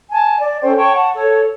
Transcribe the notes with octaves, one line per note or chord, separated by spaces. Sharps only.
G#5 A5
D5
C#4 A4 C5 G5
C#5 G5 A5 C#6
F#5 A5
A4 C#5